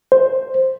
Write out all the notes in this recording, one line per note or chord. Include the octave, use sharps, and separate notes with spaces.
C5